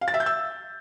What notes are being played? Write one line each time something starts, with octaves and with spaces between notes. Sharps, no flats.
F5
A6
E5
G6
E6